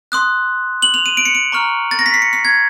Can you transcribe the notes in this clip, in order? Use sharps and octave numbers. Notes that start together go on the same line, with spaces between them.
C6 D#6 F#6
F#7
F7
D#7
D7
C#7
D7
A#5 C#6 F6
A6
A#6
B6
C7
C#7
C7
G#6